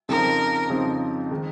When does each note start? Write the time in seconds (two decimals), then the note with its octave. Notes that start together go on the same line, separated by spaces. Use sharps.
0.09 F2 C#3 F3 C4 D#4 A#4
0.70 F2 C#3 F3 C4 D#4
1.31 D#3 G#3